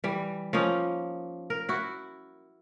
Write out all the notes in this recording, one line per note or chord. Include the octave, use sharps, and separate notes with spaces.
E3 G3
F3 A#3 C#4 D#4
A#4
E4 F#4